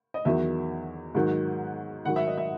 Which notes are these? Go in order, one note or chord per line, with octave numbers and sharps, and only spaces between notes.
D#5
E2 D#3 F#3 E5
G#2 D#3 F#3
G#2 D#3 F#3 F#5
E5
D#5
E5